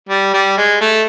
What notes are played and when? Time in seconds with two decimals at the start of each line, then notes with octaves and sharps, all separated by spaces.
0.09 G3
0.34 G3
0.58 G#3
0.81 A3